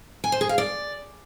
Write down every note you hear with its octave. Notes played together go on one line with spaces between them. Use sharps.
G#5
C5
G#4
F5
D5